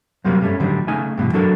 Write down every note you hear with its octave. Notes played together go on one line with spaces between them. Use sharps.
F#2 C3 F#3 G3 A#3
G2 G3 A3 C#4
A2 D3 D#3 F#3 G3
C#3 A3 D#4 G#5
G2 B2 D3 E3
F#3 D4 F#4 A4 A#4